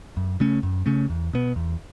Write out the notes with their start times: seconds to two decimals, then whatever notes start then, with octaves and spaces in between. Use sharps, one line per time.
0.17 F#2
0.40 C#3 A3 C#4
0.63 F#2
0.86 C#3 A3 C#4
1.10 E2
1.33 B2 B3
1.56 E2